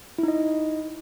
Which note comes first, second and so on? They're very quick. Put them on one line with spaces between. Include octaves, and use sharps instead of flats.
E4 D#4 D#5